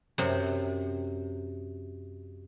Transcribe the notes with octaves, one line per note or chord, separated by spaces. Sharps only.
F#2 C3